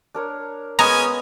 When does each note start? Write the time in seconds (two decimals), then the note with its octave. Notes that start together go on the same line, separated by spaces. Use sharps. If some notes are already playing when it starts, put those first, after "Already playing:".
0.15 D4 A#4 C#5
0.79 G#3 B3 C#4 D#5 G#5 A#5